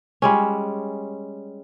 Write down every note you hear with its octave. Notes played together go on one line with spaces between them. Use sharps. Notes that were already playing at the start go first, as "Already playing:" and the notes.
G3 G#3 C#4